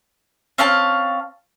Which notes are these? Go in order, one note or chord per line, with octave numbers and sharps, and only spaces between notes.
C4 C#4 F5 A5